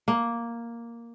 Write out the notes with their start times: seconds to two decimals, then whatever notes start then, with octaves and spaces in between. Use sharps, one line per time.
0.08 A#3